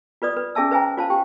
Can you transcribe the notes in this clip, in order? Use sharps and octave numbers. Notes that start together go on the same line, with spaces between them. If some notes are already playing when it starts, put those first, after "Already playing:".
F4 B4 D5 D#6
B4
C#4 G#4 E5 A5 E6
B4 C5 E5 G5 G#5 A#5
F4 C5 F5 A5
G4 G5